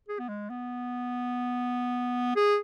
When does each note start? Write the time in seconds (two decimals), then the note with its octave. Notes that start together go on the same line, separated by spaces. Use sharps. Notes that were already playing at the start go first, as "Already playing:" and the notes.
0.08 G#4
0.19 B3
0.29 G#3
0.50 B3
2.36 G#4